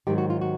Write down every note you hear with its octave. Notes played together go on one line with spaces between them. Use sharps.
G#2 D#3 F#3 G4
F#4
F4
F#4